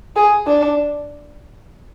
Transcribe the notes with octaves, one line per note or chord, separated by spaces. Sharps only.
G#4
D4